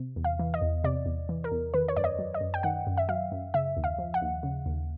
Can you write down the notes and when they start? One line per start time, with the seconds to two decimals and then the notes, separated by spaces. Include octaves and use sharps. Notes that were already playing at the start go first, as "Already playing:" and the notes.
Already playing: C3
0.16 E2
0.24 F5
0.39 E3
0.54 D#5
0.61 E2
0.84 C3 D5
1.06 E2
1.29 E3
1.44 A#4
1.51 E2
1.74 D#3 B4
1.88 C#5
1.96 F#2 D5
2.04 D#5
2.19 F#3
2.34 D#5
2.41 F#2
2.54 G5
2.63 D#3 F#5
2.87 F#2
2.97 E5
3.09 F#3 F5
3.32 F#2
3.54 C#3 E5
3.77 D#2
3.84 F5
3.98 F3
4.14 F#5
4.22 D#2
4.43 C#3
4.66 D#2